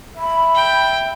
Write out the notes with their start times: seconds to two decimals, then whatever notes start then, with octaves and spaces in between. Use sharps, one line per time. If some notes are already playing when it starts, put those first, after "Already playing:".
0.18 E5 B5
0.55 G5